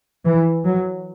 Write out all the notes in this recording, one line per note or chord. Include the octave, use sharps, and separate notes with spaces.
E3
F#3